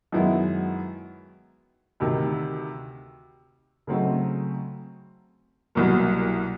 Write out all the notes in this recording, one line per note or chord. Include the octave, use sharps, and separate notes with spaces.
F#2 D#3 G#3 B3 E4
D2 C3 D#3
C#3 F#3 A3 C4 D#4
C2 B2 F#3 A#3